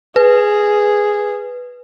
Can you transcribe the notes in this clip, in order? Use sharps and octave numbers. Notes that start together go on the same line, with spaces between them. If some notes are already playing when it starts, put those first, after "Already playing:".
G#4 B4